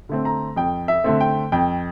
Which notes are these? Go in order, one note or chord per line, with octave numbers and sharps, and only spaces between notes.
D3 A3 C4
A#5
F2 G5
E5
D3 A3 C4
G5
F2 G5